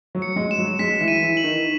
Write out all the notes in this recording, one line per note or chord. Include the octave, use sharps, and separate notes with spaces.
F#3
C#7
G#3
E7
F#3
G#3 B6
E3 E4
D#7
E3 E4
F#7
D#3 D#4